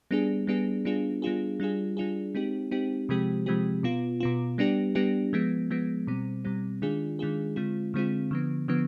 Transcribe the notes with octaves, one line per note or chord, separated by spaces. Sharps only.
G3 B3 D4 G#4
G3 B3 D4 G#4
G3 B3 D4 F4 G#4
G3 B3 D4 F4 G#4
G3 D4 F4 G#4
G3 D4 F4 G#4
G#3 C4 D#4 G4
G#3 C4 D#4 G4
C3 F3 G#3 C4 G4
C3 F3 G#3 C4 G4
B2 B3 F4
B2 B3 F4
G3 B3 D4 G4
G3 B3 D4 G4
F3 G#3 B3
F3 G#3 B3
B2 G3 C4
B2 G3 C4
D#3 G#3 D4 F4 G#4
D#3 G#3 D4 F4 G#4
D3 G#3 C4 F4
D3 G#3 C4 F4
D3 F3 B3
D3 F3 B3